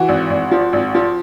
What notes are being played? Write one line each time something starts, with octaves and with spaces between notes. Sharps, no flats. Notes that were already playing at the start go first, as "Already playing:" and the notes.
Already playing: E3 F#4
G#1
G#1
F3
G#1
F3